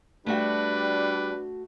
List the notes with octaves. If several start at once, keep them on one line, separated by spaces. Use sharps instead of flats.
G3 A3 D4 F#4 B4 G5